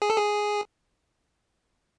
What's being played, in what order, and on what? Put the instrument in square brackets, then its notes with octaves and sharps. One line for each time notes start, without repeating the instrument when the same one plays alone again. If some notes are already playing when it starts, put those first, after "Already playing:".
[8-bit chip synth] G#4
A4
G#4